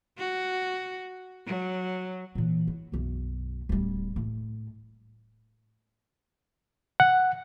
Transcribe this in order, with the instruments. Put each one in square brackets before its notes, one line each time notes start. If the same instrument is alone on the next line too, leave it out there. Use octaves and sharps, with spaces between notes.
[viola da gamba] F#4
F#3
[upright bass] A#2 E3
E4
B1 F#2
D1 G3
A2
[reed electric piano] F#5